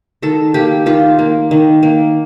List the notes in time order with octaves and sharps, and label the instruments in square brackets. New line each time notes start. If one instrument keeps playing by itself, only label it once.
[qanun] D#3 A4
A#3 G4
D#3 F4
A#3
D#3
A#3